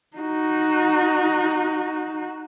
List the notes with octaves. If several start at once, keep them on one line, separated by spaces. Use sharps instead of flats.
D#4 F#4